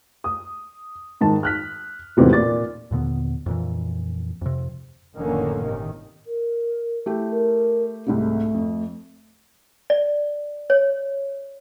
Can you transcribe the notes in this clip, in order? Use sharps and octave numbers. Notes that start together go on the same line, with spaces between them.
D#6
G#2 D#3 A5
F6 F#6 B6
G#1 E2 A2 C3 E3
A#2 D5 D6 A6
D#2 A#2 D3 B3
F2 A#2 E3
F2 C3
F1 A2 D3 D#3 A#3 C#4
G1 C3 D#3
A#4
A3 E4 G4
A#4
C2 G#2 C3 A3
F2
D5
C#5